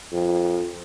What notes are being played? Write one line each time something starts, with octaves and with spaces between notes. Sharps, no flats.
F2